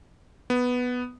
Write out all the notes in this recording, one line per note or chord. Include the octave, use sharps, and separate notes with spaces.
B3